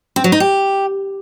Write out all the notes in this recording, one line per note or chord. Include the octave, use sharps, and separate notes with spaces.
C4
F#3
D#4
G4